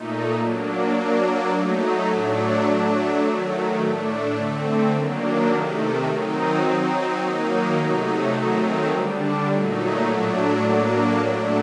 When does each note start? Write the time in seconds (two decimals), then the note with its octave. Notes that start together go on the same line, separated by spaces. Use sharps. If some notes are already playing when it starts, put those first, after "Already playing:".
Already playing: A#2 A3 D#4
0.35 F#3 A#3 D4
0.93 F#3 A#3 D4
1.49 F#3 A3 D#4
2.06 A2 F#3 A3 D4
2.64 F#3 A3 D4
3.21 D#3 F#3 A3
3.77 A2 A3 D4
4.34 D3 A3 C4
4.91 D#3 F#3 A#3 D4
5.48 C3 D#3 A3
6.05 D#3 F#3 C4 D#4
6.62 F#3 C4 D#4
7.19 D#3 F#3 A#3 D#4
7.75 C3 F#3 A3 D#4
8.32 D#3 F#3 A3 C4 D#4
8.89 D3 G3 D4
9.47 A#2 F#3 A3 D#4
10.04 A2 F#3 A3 D4
10.61 A2 F#3 A#3 D4
11.18 A2 F#3 A3 D4